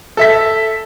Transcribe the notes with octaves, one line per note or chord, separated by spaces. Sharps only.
A4 E5 B6